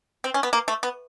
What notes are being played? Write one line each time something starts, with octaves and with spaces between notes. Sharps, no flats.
C4
C#4
B3
A#3
A3
B3